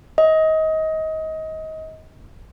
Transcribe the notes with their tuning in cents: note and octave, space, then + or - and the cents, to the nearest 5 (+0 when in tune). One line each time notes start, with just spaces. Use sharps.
D#5 +25